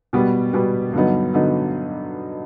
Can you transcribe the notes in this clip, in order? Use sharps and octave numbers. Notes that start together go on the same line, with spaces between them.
B2 G3 B3
B2 G3 B3
G2 D3 F#3 B3 D#4
D3 F#3 B3 D#4